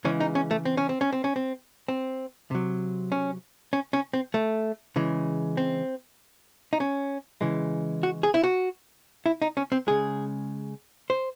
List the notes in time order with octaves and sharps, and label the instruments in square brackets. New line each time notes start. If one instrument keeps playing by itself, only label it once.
[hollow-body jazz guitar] C#3 E3 G#3 C#4
D#4
C#4
A3
C4
C#4
C4
C#4
C4
C#4
C4
C4
C3 F#3
C#4
C#4
C#4
C4
A3
C#3 E3 G#3
C4
D#4
C#4
C#3 E3 G#3
F#4
G#4
E4
F#4
E4
D#4
C#4
C4
C#3 G#3 G#4
C5